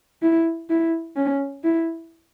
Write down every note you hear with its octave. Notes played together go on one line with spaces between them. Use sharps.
E4
E4
C#4
E4